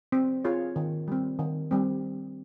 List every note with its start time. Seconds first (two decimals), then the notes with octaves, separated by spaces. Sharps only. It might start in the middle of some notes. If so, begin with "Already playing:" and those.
0.12 C4
0.44 F4 G#4 C#5
0.76 D#3
1.08 G3 C4
1.39 D#3
1.71 G3 C4